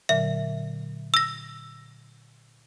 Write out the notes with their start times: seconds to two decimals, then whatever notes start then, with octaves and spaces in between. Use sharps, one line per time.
0.09 A#2 D3 F#3 E5
1.14 E6 A#6